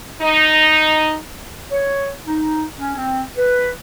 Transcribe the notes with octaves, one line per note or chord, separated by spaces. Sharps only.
D#4
C#5
D#4
C#4
C4
B4